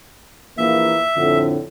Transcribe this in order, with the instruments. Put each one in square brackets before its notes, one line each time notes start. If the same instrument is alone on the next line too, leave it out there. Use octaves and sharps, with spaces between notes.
[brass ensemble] A#1 E3 A#3 [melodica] E5
[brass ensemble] F2 A2 D3